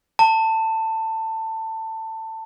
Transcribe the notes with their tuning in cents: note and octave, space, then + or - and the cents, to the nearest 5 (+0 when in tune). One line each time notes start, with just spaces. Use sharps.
A5 +20